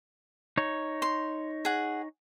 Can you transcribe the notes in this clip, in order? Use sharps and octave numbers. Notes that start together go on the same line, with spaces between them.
D#4 C#5
C6
G#4 F#5